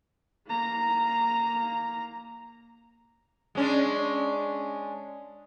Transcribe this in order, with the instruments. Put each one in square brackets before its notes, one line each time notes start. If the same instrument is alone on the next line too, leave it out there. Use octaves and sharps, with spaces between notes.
[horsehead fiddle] A#3 A#5
[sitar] G#3 C#4 D4